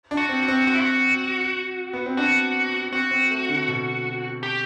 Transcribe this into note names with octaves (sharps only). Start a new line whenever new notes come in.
D4
F#4
C4
F#4
C4
F#4
E4
F#4
B3
C4
D4 F#4
C4 F#4
C4
A3
D3
B2
G4